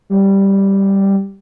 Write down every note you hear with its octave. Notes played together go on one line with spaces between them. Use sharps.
G3